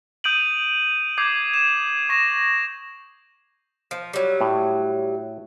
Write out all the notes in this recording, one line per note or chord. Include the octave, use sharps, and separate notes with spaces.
D#6 G6 D7 D#7 F#7
D6 D#6 G6 G#6 C7
E7
C#6 A#6 E7
F3
F#3 G3
A2